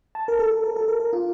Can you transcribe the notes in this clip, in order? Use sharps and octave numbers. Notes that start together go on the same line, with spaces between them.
A5
A#4
A4
A4
A#4
A4
A#4
A#4
F4